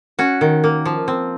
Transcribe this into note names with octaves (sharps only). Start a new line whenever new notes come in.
C#4 F#4
D#3
A#3
F3
C4